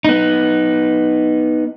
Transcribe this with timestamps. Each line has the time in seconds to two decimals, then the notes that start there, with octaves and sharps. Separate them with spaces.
0.05 B3 D#4